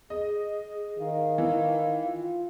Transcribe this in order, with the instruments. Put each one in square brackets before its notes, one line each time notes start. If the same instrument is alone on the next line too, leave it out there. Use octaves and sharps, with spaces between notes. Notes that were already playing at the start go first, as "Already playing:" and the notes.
[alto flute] G#4 [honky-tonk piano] D#5
[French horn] D#3 [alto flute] F5
[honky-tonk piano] E3
[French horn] F4